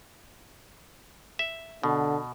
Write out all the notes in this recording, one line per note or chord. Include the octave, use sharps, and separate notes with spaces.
E5
B2 D3